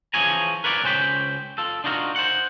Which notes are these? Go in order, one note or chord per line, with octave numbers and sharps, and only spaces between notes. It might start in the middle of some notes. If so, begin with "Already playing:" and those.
E3 F3 G#4 C#5 G#5 A#5
A#4 B4 C#5 D5
C#2 C#4 C5 G5 B5
F4 A4
D4 D#4 F4 F#4 A#4
C5 F#5